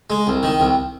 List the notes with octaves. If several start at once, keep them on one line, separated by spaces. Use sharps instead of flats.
G#3
C2
D#3
C2